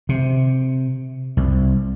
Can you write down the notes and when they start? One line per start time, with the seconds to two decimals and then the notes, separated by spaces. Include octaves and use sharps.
0.09 C3
1.37 C2